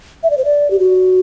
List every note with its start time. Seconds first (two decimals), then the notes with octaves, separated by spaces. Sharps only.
0.23 E5
0.30 D5
0.37 C5
0.44 D5
0.70 G4
0.79 F#4